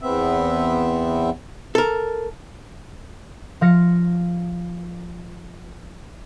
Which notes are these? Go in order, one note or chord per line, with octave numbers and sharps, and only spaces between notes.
E2 B3 C4 E5
A4 A#4
F3 F5 A#6 C#7